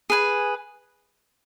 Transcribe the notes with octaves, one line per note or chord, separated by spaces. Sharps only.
G#4 B4 G#5